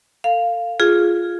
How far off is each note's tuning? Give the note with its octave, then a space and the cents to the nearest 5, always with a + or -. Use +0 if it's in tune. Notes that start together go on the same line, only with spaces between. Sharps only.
A4 +35 F5 +0
F4 +0 G#4 +5